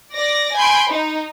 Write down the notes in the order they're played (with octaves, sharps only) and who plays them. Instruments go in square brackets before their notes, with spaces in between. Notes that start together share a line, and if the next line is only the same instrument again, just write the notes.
[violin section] D5 A#6
G#5 B5 C6 G6 D7
D#4